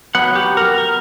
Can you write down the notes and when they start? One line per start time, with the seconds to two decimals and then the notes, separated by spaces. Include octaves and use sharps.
0.15 F#3 B3 F#5
0.35 G4
0.57 A#4
0.78 A#4